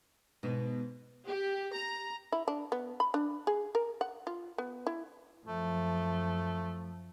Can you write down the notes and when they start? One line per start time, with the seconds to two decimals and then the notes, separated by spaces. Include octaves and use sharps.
0.43 G#2 B2 B4
1.27 G4
1.75 A#5
2.32 E4
2.48 D4
2.72 B3
3.00 B5
3.14 D4
3.47 G#4
3.75 A#4
4.01 F#5
4.27 F4
4.58 B3
4.87 E4
5.45 F#2 F3 A3